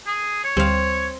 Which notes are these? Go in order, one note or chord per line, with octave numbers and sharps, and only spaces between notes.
G#4
C#5
D2 G3 C4 F5